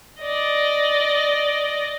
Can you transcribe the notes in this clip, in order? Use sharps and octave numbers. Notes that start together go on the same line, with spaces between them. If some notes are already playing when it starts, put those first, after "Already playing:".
D5 D#5